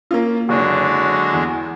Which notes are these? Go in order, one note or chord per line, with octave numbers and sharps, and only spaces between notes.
A#3 C#4 F4
F#1 D3 G#3 D4 F#4
E2